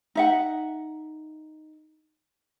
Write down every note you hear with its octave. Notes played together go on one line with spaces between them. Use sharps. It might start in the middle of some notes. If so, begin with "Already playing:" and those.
D#4 E5 F#5